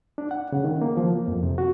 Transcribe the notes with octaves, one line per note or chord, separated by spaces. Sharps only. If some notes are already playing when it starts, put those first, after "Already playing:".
D4
F#5
C#3
D#3
A#3
F3
A#3
F2
C3
F#4